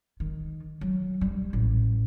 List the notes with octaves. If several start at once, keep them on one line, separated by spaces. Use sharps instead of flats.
D#3
F#3
G3
A1